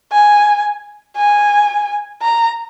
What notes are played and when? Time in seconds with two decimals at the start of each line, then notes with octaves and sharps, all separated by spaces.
0.12 G#5
1.16 G#5
2.22 A#5